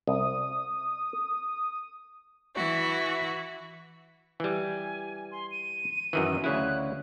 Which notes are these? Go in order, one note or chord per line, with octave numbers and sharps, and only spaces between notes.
C2 D#6
E3 E4 F#4
E3 G3 G#5
C6
D#7
F#2 D#3 E3
D2 C#3 E4 F#6